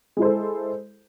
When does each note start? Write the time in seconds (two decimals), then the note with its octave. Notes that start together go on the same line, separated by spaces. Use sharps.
0.17 G#3
0.19 E4
0.22 C5
0.24 A4